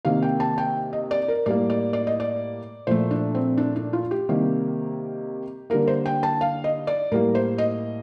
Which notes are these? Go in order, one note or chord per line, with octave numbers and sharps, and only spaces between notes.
C3 D#3 A#3 F5
G5
A5
G5
D#5
D5
A#4
A2 G3 A#3 D5
D5
D5
D#5
D5
A#2 F3 A3 C5
D4
C4
D4
D4
F4
G4
C3 D#3 G3 A#3
D3 G3 A#3 A#4
C5
G5
A5
F5
D#5
D5
A2 G3 A#3 A#4
C5
D#5